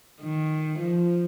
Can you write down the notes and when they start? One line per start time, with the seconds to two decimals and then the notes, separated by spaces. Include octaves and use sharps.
0.22 D#3
0.79 F3